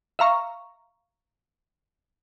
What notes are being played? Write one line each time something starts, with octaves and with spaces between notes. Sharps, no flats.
E5 F5 A#5 C#6